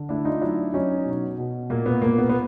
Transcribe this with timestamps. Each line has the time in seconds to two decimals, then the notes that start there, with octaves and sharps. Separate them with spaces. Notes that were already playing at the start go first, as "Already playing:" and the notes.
Already playing: D3
0.09 A3 D4 E4
0.25 D#4 F4
0.41 F#3 D4 E4
0.73 F#3 C#4 D#4
1.05 B2
1.38 B2
1.70 A#2 A#3
1.86 B3
2.02 A#2 A#3
2.18 B3
2.29 B3